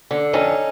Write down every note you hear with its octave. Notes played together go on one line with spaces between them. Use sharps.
D3
F2 C#4 D#4